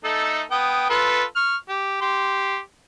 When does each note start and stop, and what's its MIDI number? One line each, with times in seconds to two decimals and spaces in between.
0.04 0.43 57
0.04 0.43 63
0.04 0.43 69
0.51 0.87 59
0.51 0.87 79
0.51 0.87 87
0.90 1.24 65
0.90 1.24 69
0.90 1.24 71
1.36 1.57 85
1.36 1.57 89
1.69 2.00 67
2.01 2.59 67
2.01 2.59 84